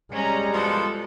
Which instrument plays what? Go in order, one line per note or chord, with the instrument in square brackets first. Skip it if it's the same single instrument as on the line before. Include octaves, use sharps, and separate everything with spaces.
[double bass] G3 G#3 [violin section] C#4 A#5
[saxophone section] F3 B3 F#4 [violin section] A4